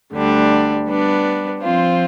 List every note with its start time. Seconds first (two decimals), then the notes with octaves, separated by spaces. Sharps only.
0.13 D2 D3 G3 D4
0.87 G3 B3 D4
1.62 F3 C4 F4 C5